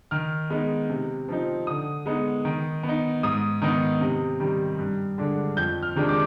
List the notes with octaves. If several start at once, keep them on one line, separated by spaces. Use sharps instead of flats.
D#3 F6
G#3 B3 D#4
C3
F3 C4 D#4
D3 D#6
G#3 B3 D#4
D#3
B3
D#4
G#2 D#6
D#3 B3 D#4
C3
D#3 G3
G2
D3 G#3 D4
F2 G6
F6
C3 D#3 G#3 D4
D6